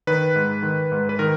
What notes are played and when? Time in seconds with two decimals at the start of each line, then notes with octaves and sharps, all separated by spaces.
0.07 D#3 B4
0.36 G#2
0.63 D#3
0.92 G#2
1.09 B4
1.19 D#3 A#4